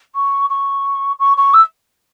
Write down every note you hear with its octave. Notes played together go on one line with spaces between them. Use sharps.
C#6
C#6
C#6
C#6
E6